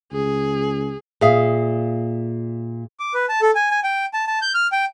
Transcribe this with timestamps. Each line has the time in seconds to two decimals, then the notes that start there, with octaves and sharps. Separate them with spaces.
0.12 C#2 G#4
1.21 A#2 G#4 E5 F5 D#6
3.00 D6
3.14 B4
3.29 A5
3.42 A4
3.55 G#5
3.71 G#5
3.84 G5
4.13 A5
4.27 A5
4.42 G6
4.54 F6
4.72 G5